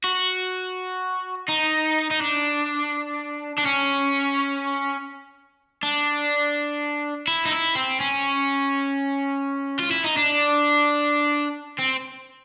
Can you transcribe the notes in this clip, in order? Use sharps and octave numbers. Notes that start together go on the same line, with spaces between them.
F#4
D#4
D#4
D4
D4
C#4
D4
E4
D#4
E4
C4
C#4
F4
E4
D#4
D4
C4